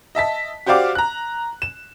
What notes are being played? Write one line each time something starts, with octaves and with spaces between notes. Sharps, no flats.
D#5 E5 A5 B6
F#4 G4 C5 D5 F5 D6
A#5 F#6
E7